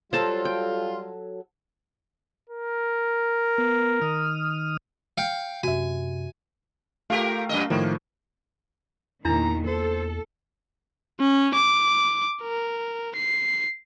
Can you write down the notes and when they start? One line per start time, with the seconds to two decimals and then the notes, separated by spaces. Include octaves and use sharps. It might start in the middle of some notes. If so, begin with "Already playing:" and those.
0.13 F#3 G3 F4 A4 C5 A5
0.45 G5
2.50 A#4
3.58 B3
4.02 D#3 D#6 F6
5.18 F5 G5 C#7
5.63 F#2 C3 F#4 E5 G#5
7.10 A3 F4 G4 A#4 F5
7.49 F#2 A#2 D#5
7.70 A2 D#3 F3 A#3
9.25 E2 A#2 D#3 D4 E4 A#5
9.67 A4 C5
11.20 C#4
11.54 D6
12.42 A#4
13.16 C7